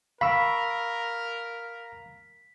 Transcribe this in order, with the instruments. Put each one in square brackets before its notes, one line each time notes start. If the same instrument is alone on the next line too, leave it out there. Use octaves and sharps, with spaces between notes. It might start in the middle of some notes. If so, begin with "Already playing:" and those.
[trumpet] A#4 [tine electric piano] F5 [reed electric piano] B5 C#6 E6 [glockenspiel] B6